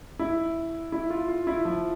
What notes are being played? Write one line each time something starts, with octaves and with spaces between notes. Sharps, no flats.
E4
E4
F4
F4
E4
F3